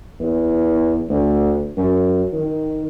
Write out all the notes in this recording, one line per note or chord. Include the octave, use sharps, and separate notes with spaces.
E2
D2
F#2
D#3